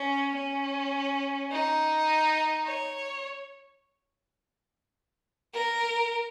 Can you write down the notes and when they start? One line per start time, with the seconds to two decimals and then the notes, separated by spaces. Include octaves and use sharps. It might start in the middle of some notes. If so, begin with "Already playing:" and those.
Already playing: C#4
0.36 C#4
1.51 D#4
2.66 C#5
5.54 A#4